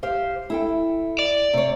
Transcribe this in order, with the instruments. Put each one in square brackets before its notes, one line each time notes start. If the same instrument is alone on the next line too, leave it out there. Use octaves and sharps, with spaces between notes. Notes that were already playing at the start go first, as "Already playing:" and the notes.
[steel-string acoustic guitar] G4 C5 F5
E4 A4 G5
[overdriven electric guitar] D5
[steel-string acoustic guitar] C3 C#5